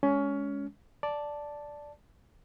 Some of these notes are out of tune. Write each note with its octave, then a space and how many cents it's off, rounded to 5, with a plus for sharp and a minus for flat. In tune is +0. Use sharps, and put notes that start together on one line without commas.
G#3 +0 C#4 +20
D5 +0 A5 +0